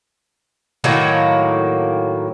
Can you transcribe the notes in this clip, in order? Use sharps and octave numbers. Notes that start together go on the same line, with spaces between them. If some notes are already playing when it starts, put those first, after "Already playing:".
A2 D#3 F#3 A#3